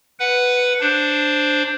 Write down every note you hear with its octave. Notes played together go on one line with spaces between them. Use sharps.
B4 F#5
D4 C5